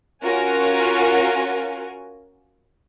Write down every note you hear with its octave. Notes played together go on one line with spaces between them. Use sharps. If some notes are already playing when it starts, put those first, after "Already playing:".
C#4 F4 F#4 A#4 G#5